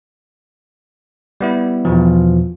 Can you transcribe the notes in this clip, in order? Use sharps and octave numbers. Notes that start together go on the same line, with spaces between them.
G3 B3 E4
E2 B2 E3 F3